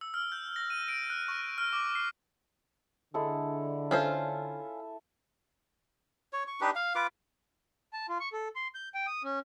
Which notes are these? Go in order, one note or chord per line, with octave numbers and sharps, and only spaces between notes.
E6
F6
G6
A#6
D#7
D7
F#6
C#6
F6
D6
C7
D3 G#3 E4 A4
C#4 F4 A4 C5 E5
C#5
C#6
D4 D#4 G4 B4
F5
F4 B4 D6
A5
F4
C#6
A4
C6
G6
G5
D#6
C#4